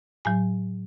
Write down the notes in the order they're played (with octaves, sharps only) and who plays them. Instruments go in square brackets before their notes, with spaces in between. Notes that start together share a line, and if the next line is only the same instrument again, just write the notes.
[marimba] A2 F#3 G#5